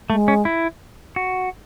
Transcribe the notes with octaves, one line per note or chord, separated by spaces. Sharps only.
G#3 A3
C#4
E4
F#4